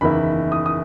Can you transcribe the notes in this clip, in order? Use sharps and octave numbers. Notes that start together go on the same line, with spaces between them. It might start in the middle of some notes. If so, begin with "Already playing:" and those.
F#1 E2 D#3 A#3 E4 B5
D#6
D#6